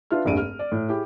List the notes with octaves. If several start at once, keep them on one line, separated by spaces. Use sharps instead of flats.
D4 F4 B4 E5 F6
F1 A#1 G2 D7 D#7
F6
D5
A2
E4 G4 G#4